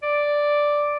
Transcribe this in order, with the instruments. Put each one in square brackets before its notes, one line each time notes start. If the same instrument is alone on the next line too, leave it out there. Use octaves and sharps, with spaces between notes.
[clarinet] D5